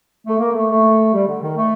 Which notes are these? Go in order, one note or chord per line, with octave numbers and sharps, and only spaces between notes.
A3
A#3
A3
A3
G3
D3
D#3
A3